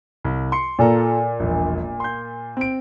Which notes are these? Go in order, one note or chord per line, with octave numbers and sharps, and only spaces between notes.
C2
C6 C#7
A#2 F4 A4 A#5
E1 A#1
C6 G6
C4 D7